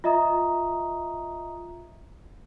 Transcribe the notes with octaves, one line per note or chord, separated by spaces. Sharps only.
F4 D#5 E5 A#5 D#6